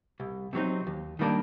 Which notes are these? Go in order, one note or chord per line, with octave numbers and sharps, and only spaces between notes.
C2
C3 F#3 C4 D#4
D#2
D#3 G3 A#3 D4